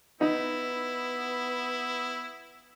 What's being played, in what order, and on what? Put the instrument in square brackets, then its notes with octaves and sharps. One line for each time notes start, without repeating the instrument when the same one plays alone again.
[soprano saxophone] B3 [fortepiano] D#4 [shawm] E4